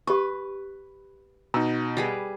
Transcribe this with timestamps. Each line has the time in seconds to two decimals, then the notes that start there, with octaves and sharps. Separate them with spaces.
0.07 G4 B4 C#6
1.54 B2 D#4 A#5
1.97 G3 G#4 B4